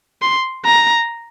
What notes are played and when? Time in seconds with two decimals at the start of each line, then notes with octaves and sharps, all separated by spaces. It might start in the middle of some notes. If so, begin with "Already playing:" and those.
0.22 C6
0.65 A#5